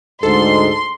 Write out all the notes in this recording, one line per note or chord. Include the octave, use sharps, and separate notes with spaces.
D2 G#2 A4 C6